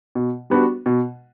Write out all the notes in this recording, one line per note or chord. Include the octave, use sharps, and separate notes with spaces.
B2
G3 B3 D4 F#4
B2